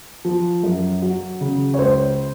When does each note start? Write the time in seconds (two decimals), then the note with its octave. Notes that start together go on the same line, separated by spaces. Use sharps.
0.25 F3
0.64 F#2
1.02 F#3
1.41 C#3
1.74 C#5
1.79 C#2 C5